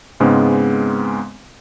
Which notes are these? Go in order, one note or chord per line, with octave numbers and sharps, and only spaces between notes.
G#2 C#3 G#3 B3 C4